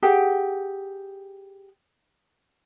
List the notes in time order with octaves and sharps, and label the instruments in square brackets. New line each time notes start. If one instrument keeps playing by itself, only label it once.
[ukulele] G4 G#4 F#5 G5